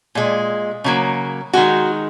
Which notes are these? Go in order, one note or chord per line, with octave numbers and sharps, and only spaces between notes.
A#2 G#3
C#3 F#3 A#3
D#3 G#3 F#4